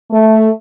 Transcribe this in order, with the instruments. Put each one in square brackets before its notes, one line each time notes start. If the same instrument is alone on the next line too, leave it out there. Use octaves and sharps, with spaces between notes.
[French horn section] A3